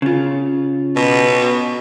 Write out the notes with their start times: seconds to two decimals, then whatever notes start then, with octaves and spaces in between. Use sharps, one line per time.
0.02 C#3 F4
0.96 B2